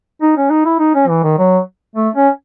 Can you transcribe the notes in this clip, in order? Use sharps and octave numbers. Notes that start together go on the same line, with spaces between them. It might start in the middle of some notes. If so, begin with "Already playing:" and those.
D#4
C#4
D#4
E4
D#4
C#4
E3
D#3
F#3
A3
C#4